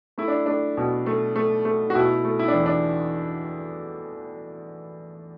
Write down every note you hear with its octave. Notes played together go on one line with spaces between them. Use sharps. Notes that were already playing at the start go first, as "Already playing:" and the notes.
A3 E4
D4
A3 D4
B2
A3
A3
A3
F#4
B2 E4
A3
E4
D4
E2
D4